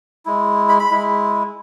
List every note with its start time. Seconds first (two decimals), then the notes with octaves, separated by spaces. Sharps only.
0.25 G#3 E4
0.69 B5
0.80 B5
0.91 G#3 E4